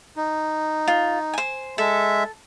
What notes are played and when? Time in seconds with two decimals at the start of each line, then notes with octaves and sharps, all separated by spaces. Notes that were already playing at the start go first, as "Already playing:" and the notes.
0.16 D#4
0.87 F4
1.33 C5 G#5
1.78 G#3 A4 E5